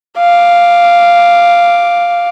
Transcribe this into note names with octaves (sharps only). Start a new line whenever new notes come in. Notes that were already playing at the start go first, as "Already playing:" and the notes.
F5 D6